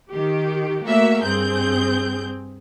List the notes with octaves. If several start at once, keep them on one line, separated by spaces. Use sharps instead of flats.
D#3 G4
A3 A#3 F#4 A#4 E5
G2 C4 G#4 G6